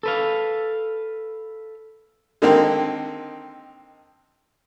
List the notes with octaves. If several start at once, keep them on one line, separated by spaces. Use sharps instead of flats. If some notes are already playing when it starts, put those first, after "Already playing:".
A4 B4 F5
D3 D#3 G#3 A#3 C4